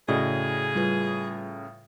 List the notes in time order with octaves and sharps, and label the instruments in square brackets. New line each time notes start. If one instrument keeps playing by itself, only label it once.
[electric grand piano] A2 C#3 [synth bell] F#4 D5 D#5 [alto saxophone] G#4
[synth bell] G3 F4 B4